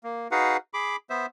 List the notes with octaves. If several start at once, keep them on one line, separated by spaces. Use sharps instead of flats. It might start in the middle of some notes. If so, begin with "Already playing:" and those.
A#3
D#4 F#4 G#4 B4 F5 F#5
G#4 B5 D6
B3 C5 E5